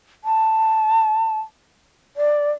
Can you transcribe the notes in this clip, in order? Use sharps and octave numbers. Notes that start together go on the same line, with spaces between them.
A5
D5